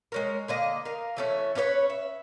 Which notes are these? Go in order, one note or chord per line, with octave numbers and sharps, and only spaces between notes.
G#3 C#4 A#4
D3 A#3 D#5
A#4 F5
E3 A3 C#4
C#4 D4 B4 C#5
E5